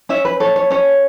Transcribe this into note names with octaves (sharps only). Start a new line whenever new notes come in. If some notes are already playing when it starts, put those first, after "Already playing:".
C#4 C#5 E5
B4
A4 C#5
C#5
C#4 C#5